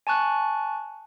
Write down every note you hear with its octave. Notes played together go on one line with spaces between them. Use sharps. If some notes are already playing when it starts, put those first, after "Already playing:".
G#5 A5 C#6 F#6